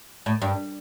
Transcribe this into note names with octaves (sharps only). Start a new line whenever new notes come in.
A2
G2